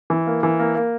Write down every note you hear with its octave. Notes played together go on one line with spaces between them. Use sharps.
E3
A#3
E3
A#3
A#3